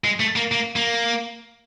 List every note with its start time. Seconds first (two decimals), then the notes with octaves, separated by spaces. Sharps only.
0.04 G#3
0.20 A3
0.36 A#3
0.52 A#3
0.76 A#3